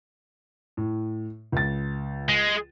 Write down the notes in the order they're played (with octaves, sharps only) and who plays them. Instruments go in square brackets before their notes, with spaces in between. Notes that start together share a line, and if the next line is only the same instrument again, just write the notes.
[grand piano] A2
C#2 A6
[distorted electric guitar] G#3